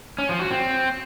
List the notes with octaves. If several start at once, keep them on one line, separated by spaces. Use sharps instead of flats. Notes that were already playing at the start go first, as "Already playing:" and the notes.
C#4
F3
F#4
C4